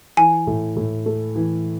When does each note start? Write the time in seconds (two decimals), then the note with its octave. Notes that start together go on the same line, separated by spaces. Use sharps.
0.17 E3 G#5
0.47 A2
0.76 A2
1.06 A3
1.36 E3